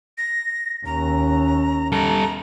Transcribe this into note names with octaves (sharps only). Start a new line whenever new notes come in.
A#6
D#2 C#4 A#5
G3 A4 A#5